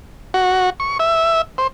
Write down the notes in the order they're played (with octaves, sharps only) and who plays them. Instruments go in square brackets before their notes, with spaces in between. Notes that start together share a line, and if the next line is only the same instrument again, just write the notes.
[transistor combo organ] F#4
C#6
E5
C5